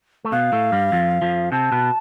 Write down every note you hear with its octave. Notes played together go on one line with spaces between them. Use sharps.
A3
B2 B3 F5
A2 A3
G2 G3
F2 F3
F2 F3
C3 C4 A5
B2 B3